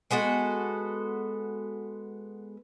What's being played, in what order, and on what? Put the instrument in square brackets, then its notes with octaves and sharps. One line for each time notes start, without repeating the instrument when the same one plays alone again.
[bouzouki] G#3 B3 F#4 A4